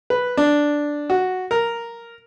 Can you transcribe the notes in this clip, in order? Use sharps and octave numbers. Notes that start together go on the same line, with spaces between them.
B4
D4
F#4
A#4